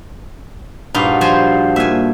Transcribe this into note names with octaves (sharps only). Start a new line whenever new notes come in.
G2 A#2 D#4 F#4 F5
F3 C5 G#5
A#2 E5 G#5